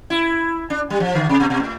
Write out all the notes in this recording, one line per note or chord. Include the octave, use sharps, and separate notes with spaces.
E4
D4
G3
F3
D3
C3
B2
B2
A2